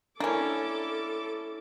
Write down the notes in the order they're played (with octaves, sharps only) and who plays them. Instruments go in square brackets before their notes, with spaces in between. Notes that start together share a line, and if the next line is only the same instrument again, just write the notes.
[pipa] A#3 C#4 [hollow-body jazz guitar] D4 E4 [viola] A4 D6